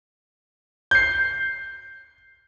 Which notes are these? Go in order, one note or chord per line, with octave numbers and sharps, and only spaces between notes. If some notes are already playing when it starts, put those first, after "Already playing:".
G6 C7